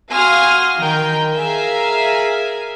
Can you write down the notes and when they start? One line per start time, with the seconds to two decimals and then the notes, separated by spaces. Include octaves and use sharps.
0.12 F#4 F5 G#5 C6 D#6 F6
0.78 D#3 A#4 G5
1.35 G#4 A#4 E5 F5 G#5